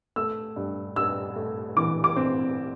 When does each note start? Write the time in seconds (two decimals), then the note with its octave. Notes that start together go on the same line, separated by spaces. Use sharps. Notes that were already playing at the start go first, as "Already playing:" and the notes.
0.16 A3 E6
0.56 G2
0.96 G2 E6
1.36 A3
1.77 E3 D6
2.04 D6
2.16 C4